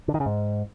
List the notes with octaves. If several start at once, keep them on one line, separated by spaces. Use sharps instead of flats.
D3
D#3
C#3
G#2